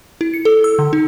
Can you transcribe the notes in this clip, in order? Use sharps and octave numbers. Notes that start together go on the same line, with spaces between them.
E4
C#7
A4
E6
D3
D#4